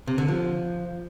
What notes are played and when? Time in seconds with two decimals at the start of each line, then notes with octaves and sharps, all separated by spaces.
0.07 C3
0.18 D3
0.28 F3